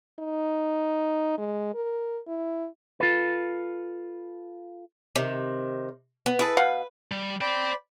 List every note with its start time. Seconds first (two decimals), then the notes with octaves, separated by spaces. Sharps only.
0.19 D#4
1.38 G#3
1.74 A#4
2.27 E4
3.00 F4 A4 B4
5.15 C3 D#3
6.26 B3
6.39 E4 G#4 A4 B4
6.57 B2 F5 F#5
7.12 G3
7.41 C5 D5 G5 B5